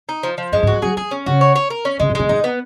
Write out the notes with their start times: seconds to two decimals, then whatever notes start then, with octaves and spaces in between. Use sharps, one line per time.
0.09 D#4
0.23 F3
0.38 F3
0.52 F#2 G#3
0.63 G#2
0.67 F3 F#4
0.82 F#3 G#4
0.97 F3 G#4
1.11 C#4
1.26 C#3 F#4
1.41 C#5
1.56 C#5
1.70 A#4
1.85 C#4
2.00 C#3 G#3
2.10 B2
2.15 A#2 G#3
2.29 A#2 D#4
2.44 B3